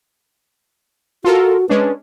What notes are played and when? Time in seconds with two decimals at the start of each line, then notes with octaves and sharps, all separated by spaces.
1.24 F4 F#4 A4 A#4
1.69 G#3 C#4 D4 B4